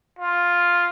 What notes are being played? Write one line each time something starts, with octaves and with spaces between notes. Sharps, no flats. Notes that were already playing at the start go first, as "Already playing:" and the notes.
F4